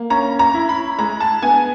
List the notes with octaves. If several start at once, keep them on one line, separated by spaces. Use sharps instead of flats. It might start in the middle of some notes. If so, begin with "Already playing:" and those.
Already playing: A#3
C#4 A#5
A#5
E4
B5
G#3 A#5
A5
B3 G#5